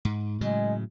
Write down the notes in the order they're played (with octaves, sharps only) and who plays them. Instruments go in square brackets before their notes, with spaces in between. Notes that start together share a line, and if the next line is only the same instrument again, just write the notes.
[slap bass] G#2
[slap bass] A2 C#3 F#3 [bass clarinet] G#3